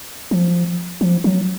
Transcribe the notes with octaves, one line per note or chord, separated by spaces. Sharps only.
F3
F3
F#3